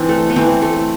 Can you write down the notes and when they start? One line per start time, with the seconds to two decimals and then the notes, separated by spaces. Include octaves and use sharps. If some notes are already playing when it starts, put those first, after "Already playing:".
Already playing: E3 C4 D4 E4
0.09 A3
0.30 B3
0.36 E3 C4
0.62 A3